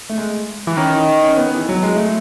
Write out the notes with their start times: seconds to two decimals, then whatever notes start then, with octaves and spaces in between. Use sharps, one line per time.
0.09 A3
0.18 G#3
0.67 E3
0.77 D#3 C#4
1.23 C#4
1.37 B3
1.55 E3
1.69 F#3
1.83 G#3
1.96 A3